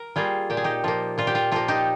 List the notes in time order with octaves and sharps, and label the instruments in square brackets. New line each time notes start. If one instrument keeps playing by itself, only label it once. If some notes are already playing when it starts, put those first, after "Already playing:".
Already playing: [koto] A#4
G3 A#3 F4 G#4
A#2 G4
G#4
D#4 G4
F3 A#3 F4
A#2 F4
G4
F4
F3 A#3 F4
D#4 G4